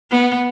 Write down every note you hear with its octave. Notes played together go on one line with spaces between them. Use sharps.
B3